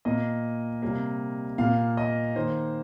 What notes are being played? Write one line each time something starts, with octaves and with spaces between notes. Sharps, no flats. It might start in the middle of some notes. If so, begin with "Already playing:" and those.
A#2 A#3 D#5
C3 G3 A#3
A#2 A#3 F5
D#5
D#3 A#3 C5